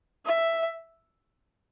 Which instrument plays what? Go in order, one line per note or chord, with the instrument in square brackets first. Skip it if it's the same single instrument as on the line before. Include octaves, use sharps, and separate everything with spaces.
[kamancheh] E5